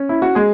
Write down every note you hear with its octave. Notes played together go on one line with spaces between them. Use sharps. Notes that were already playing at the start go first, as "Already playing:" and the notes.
Already playing: C#4
E4
F#4
G#3 G#4